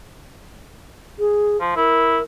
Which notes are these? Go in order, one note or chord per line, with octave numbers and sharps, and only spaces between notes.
G#4
F3
E4 A#4